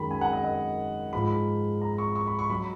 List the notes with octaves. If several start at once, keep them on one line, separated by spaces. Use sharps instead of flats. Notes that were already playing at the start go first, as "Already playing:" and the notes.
Already playing: F#2 D#3 G#3 B5
G#5
F#5
D#5
D#5
G#2 F3 G#3 B5
A#5
C#6
C#6
B5
C#6
F#3 B5